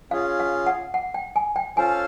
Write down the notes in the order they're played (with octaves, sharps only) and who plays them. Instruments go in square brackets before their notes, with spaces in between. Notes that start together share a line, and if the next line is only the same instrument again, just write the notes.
[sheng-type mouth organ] C#4 F4 G#4 [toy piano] F5
[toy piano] F5
F#5
F#5
G5
G#5
G5
[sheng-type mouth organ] C#4 F4 A4 C5 F5 [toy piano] G#5